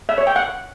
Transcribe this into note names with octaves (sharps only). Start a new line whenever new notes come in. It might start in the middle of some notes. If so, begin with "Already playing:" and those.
E5
C#5
G5
F#5